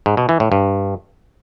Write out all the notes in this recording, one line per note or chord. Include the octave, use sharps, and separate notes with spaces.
G#2
B2
E3
A2
G2